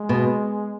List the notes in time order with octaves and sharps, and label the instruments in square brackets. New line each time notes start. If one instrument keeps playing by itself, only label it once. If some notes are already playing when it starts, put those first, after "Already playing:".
Already playing: [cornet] G#3
[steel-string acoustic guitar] B2